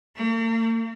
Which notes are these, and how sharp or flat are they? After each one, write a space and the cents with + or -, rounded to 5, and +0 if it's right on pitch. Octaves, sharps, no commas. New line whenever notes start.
A#3 -45